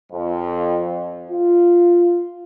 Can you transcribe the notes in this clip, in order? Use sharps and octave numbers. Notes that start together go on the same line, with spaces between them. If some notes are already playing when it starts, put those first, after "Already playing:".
F2
F4